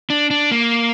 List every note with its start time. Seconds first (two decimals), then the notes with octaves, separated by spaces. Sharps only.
0.10 D4
0.31 D4
0.51 A#3